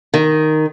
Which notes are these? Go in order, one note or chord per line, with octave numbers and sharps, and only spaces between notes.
D#3